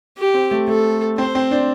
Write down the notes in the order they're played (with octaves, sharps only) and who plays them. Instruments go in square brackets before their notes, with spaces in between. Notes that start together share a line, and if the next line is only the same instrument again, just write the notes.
[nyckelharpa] G4
[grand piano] C4
A3
[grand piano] A3 [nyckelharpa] A4
[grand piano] C4 [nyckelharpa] C5
[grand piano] C4
D4